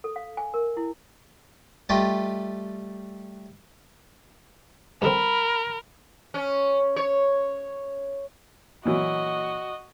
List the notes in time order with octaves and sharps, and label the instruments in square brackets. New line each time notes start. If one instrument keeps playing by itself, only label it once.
[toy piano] A4
F5
G#5
A#4
E4
[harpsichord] G3 A3 F4 G4 A4 D#5
[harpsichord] G2 D3 C4 [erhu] A#4 [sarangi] B5
[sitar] C#4
C#5
[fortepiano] A#2 E3 F#3 [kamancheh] F#4 D#5